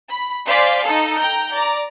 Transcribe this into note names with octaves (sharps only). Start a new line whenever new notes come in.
B5
C5 D5 F5 G#5 C6 B6
D#4 A4
G5 A#5 G6
D5 A#5